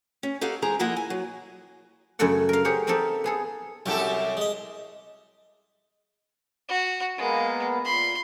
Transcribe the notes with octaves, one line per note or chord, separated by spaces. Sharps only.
C#4
D#4 G4 A4 C#5 F5 F#5
E3 G#3 C4 G#4 A#5
F3 A#3 E4 F4 D#5 F#5
G#5
F#3
F#2 C#3 A3 A4 F#5
A#4 F5
G4 G#4 C5 C#5 F#5
A#3 C4 D#4 G4 A4
B3 G#4 A4
C2 F#2 F#3 G4 A4 C#5
G#3 D#5
F#4
G#3 A#3 B3
A#2 B5 C6